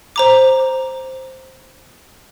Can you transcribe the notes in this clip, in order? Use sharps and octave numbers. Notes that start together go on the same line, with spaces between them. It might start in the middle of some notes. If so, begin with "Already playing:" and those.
C5 A#5 D6